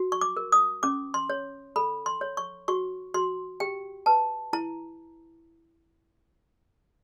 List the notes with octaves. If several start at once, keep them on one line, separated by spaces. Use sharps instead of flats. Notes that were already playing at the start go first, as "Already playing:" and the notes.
Already playing: F#4
C#6
D6
A#4
D#6
C#4 D6
C6
C#5
A4 B5
C6
C#5
C#6
F#4 C#6
F#4 C6
G4 G5
B4 A5
E4 A#5